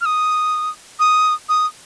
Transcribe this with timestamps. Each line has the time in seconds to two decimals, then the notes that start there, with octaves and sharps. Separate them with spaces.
0.01 F6
0.06 D#6
0.99 D#6
1.49 D#6